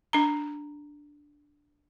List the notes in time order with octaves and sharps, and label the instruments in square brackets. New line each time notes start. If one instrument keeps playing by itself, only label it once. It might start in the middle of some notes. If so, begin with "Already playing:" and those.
[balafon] D4 A#5